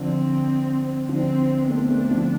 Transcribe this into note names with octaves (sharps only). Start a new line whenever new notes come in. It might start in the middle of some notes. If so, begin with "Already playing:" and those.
Already playing: D3 F3 C4
D3 F3 C4
B3
A3 C4 D4
A3 C4
D3 F3